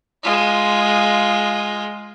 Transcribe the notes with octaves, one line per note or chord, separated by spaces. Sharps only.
G#3 F4